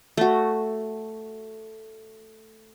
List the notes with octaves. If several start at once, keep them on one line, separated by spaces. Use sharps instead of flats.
A3 F#4